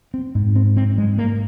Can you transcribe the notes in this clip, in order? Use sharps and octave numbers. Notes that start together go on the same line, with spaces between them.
C4
G#2
C4
C4
G#3
A#3